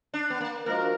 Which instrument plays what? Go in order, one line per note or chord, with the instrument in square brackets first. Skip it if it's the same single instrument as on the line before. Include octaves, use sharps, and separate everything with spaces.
[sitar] D4
B3
A#3
[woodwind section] F3 G#3 D4 F#4 A#4 [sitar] A#3